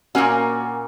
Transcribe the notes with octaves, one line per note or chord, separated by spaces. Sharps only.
A#2 F#3 A#3 C#4 F#4